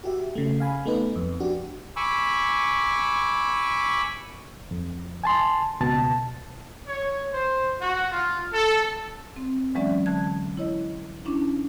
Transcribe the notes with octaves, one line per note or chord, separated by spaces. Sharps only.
F#4 G4 E5
C#3 A3
F5 G#5 B5
A3 B3 D#4 B4
F2
D4 F#4 G4
G#5 B5 C#6 D6 E6
F2
G#5 A5 C6
C#2 B2 A5
C#5
C5
F#4
F4
A4
C4
E3 F#3 G#3 C#4 D5 E5
D3 A5 G#6
E4 C#5 D#5
C#4 D4 E4